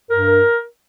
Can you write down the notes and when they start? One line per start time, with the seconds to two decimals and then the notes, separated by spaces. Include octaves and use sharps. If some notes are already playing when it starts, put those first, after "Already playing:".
0.10 G2 A#4